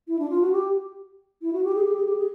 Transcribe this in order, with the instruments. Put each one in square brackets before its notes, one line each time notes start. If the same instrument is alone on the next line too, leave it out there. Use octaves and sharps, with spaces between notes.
[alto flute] E4
D4
F4
F#4
G4
E4
F#4
G4
G#4
G4
G#4
G4
G#4